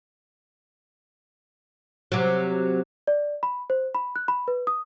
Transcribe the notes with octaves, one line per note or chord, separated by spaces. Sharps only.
C3 F#3
D5
B5
C5
B5
F#6
B5
B4
D#6